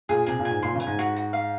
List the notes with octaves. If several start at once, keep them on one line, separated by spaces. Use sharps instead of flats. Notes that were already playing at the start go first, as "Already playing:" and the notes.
A#2 G#4
C3 G#4
A#2
G#5
G#2
A#2 C6
C#3
G#5
G#2
F#4
F#4
F5